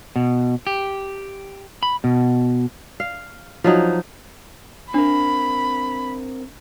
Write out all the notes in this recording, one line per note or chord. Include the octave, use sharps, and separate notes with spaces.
B2
G4
B5
B2
F5
F3 F#3 D#4
C4 D4 A#4 B5